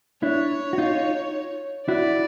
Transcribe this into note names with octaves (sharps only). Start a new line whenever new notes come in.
D4 E4 C#5
F#4
D#4 F4
E4 F#4 D5